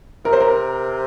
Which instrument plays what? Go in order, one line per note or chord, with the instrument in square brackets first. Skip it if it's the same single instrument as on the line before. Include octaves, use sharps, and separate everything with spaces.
[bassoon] C3 [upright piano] A#4
[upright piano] C5
A#4